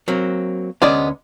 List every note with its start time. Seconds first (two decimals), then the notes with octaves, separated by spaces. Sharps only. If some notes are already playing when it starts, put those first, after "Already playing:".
0.08 F#3 A#3 C4
0.82 D2 G#3 B3 C#4 D5